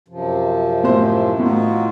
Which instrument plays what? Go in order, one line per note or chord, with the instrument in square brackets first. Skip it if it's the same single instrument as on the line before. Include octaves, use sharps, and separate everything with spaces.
[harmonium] F#2 C3 F3
[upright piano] A2 C5
[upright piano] A2 [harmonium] D#4 F4 F#4